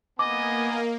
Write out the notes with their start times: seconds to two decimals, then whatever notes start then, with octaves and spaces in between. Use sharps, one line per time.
0.19 A#3 B3 D#5 G#5 D6